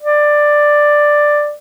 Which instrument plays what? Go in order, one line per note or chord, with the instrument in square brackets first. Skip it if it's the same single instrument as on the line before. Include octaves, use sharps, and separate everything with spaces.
[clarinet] D5